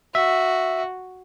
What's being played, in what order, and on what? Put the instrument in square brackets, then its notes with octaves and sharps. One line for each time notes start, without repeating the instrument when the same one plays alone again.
[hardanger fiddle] F#4 [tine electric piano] E5